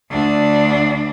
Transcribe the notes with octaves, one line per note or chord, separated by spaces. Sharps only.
D2 D4